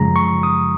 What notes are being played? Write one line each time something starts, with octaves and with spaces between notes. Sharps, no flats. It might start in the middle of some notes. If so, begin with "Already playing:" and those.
Already playing: F#2 C#3 F3 G#3 A#5
C#6
D#6